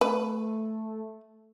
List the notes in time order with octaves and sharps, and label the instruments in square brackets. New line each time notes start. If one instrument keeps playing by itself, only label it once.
[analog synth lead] A3 [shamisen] B4